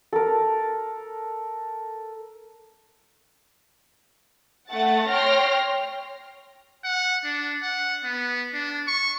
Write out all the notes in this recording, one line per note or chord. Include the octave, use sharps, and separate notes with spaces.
A4 A#4
A3 F#5 A6
C#5 G5 C6 F6 A#6
F#5
D4
F#5
B3
D4
C#6